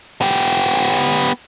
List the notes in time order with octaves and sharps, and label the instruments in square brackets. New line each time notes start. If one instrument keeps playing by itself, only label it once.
[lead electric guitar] B3 G4